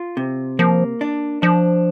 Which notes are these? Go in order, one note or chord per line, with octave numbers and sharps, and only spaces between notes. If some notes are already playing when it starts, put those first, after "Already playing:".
Already playing: F4
C3
F3 A#3
D4
F3 D4